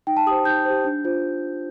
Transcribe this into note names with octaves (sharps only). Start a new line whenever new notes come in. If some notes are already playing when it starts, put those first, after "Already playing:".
D#4 G5
A5
G4 C5 D#6
D#4 G6
G4 C5
D4
F4 C5